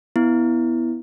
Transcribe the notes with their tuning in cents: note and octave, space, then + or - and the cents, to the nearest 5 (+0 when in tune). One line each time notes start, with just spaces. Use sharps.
B3 +0 E4 -5